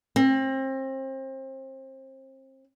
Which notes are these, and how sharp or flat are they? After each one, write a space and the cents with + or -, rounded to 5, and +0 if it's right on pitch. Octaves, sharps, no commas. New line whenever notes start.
C4 +30